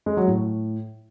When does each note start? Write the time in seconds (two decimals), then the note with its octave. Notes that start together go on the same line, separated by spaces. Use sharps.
0.06 G#3
0.17 F#3
0.28 A2